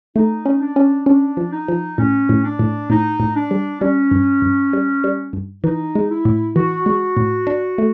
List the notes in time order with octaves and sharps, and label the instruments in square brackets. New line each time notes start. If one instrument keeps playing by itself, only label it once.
[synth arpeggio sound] A3 [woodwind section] D#4
[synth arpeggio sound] C#4
[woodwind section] D4
[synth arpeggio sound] C#4
[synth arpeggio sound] C#4 [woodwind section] D4
[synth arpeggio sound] F3
[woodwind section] D#4
[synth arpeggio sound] F3
[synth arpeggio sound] A2 [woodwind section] C#4
[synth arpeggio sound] A2
[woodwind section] D4
[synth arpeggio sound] A2
[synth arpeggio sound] A2 [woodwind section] D#4
[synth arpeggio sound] A2
[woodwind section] D4
[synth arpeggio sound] G3
[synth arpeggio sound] G3 [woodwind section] C#4
[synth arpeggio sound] G2
G2
G3
G3
G2
[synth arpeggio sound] E3 [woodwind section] D#4
[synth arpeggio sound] G#3
[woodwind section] E4
[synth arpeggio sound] A2
[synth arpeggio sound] E3 [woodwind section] F#4
[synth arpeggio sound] G#3
A2
D4
A3